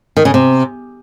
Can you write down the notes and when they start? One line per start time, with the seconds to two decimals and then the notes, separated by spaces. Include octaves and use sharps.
0.17 D#3
0.25 C#3
0.34 C3